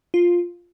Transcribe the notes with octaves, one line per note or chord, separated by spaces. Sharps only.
F4